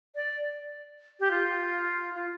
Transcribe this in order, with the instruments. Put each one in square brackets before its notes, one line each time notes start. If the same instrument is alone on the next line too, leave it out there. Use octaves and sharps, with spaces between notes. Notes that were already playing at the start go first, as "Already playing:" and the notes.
[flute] D5
G4
F4
F4